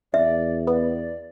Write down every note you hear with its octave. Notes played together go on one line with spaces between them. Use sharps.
E2 D5 E5
B3 D5